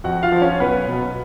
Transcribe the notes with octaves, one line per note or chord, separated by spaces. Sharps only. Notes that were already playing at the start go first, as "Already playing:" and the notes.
F2 F#4 F#5
F4 F5
F3
C#4 C#5
B1 B3 B4
B2 F#3